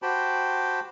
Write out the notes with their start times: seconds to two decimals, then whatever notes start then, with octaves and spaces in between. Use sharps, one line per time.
0.02 F#4 G4 C5 G5 A5 B5